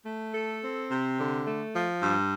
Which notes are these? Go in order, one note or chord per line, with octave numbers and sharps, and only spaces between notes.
A3
A4
C4
C3
D3
A3
F3
G2